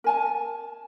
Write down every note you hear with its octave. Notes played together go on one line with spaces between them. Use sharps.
A#4 G#5 A5